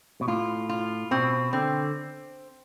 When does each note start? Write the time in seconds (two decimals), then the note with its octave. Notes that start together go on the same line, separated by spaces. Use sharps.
0.21 B2
0.28 A2 F4
0.69 F4
1.11 B2 C4
1.53 D3 C4